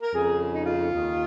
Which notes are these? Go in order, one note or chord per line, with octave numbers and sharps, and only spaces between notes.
A#4
F2 C#3 G#4
D#4
F4
D#2 D#3